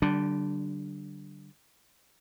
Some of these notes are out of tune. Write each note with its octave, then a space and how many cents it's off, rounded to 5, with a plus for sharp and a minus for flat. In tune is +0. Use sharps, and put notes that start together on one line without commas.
D3 +0 G3 -35 D4 +0